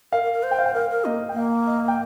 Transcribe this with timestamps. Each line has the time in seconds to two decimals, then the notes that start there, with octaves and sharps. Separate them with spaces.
0.12 A#4 F5
0.23 A#4
0.33 A#4
0.43 C5
0.51 G5
0.59 F5
0.66 G5
0.74 A#4 F5
0.90 A#4
1.05 A#3 D#5
1.29 G5
1.32 A#3 F5
1.67 D#5
1.78 F5
1.88 G5